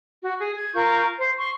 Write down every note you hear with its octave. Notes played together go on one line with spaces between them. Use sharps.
F#4
G#4
G#6
F4 A#4 C#6 G6
C5
C6 C#6